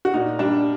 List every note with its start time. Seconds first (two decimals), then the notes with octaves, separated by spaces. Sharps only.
0.05 F#4
0.14 A#2 D#4
0.39 G3 D4